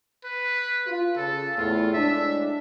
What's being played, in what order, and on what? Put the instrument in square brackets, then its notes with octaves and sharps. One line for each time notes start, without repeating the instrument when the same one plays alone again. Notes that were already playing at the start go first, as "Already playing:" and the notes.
[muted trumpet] B4
[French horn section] F4
[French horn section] C#3 [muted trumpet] A4
[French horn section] E2 A2 A3 [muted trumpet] F4
[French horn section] A2 G#3 D4 [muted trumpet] E5